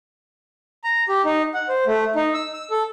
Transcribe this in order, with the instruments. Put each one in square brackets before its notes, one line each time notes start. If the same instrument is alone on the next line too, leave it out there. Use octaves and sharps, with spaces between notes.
[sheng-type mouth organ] A#5
G4
D#4
F#5
C5
A3
D#4
E6
E6
A4